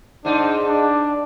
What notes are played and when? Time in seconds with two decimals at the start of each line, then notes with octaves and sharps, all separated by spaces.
0.25 G#2 D4 D#4
0.67 D4